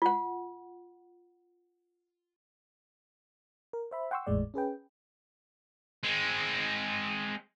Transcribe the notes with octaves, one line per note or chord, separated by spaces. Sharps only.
F4 F#5
A#4
C5 E5 B5
F#5 G5 C6 C#6 E6
G#1 E2 A2 G#3 D5
C#4 G#4 B4 G5
G#3 C4